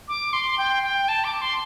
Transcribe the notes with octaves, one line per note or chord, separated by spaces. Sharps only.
D6
C6
G5
G5
A5
D6
C6